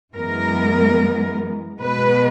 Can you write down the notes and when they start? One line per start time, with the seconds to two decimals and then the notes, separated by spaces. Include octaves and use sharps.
0.14 F#2 E3 G#3 B3 A#4
1.79 B2 G#3 B3 B4